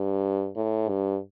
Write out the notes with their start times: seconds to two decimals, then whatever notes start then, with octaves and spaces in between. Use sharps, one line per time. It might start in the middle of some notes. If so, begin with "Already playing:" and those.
Already playing: G2
0.56 A2
0.89 G2